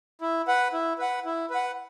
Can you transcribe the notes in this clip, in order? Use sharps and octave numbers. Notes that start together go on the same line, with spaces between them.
E4
B4 F#5
E4
B4 F#5
E4
B4 F#5